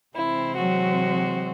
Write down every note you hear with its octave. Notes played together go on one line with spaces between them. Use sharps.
C3 E3 G#3 C4 E4
F#3 F#4